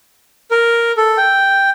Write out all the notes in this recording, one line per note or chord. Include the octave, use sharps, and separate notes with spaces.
A#4
A4
G5